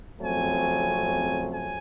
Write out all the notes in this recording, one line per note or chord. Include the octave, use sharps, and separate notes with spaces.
F2 C#3 F#3 A3 C4 G#5
G#5